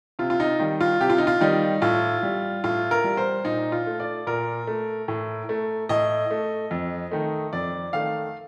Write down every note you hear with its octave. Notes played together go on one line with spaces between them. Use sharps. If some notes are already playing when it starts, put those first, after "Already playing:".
C3 F4
F4
D#4
D#3 G3
F4
C3 G4
F4
D#4
F4
D#3 G3 D#4
A2 F4
G3
A2 F4
A#4
G3
C5
A#2 D#4
F4
A3
D5
A#2 A#4
A3
A2
A3
A2 D#5
A3
F2
D#3 A3
F2 D5
D#3 A3 F5